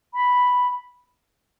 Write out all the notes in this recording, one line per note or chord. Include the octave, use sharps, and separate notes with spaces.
B5